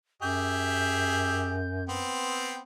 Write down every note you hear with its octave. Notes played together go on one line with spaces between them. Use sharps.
F#2 G4 G#4 E5 G6
B3 C4 G5